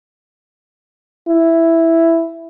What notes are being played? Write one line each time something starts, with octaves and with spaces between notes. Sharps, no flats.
E4